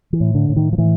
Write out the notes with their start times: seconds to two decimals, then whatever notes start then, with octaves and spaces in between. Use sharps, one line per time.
0.13 E3
0.20 A2
0.35 D3
0.49 A2
0.56 D#3
0.73 F3
0.78 A2 E3